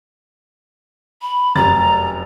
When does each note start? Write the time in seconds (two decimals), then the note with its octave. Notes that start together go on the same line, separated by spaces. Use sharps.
1.22 B5
1.55 F1 F#2 A#5 A6